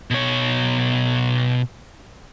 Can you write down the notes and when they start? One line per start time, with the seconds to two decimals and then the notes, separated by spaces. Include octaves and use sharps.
0.11 B2 C#5